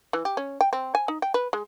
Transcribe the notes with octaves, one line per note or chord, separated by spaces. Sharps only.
E3
G4
C#4
G5
C4
G#5
D#4
G5
B4
G#3